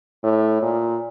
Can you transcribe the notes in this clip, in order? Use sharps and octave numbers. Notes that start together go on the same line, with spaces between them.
A2
A#2